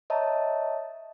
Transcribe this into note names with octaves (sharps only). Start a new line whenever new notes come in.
C#5 D#5 E5 A5 A#5